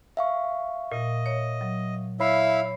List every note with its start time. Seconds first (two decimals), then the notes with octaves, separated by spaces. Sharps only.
0.17 E5 F5 C#6
0.92 A#2 D#5
1.26 C#5
1.61 F#3
2.20 E4 C#5 E5 F5 B5 C7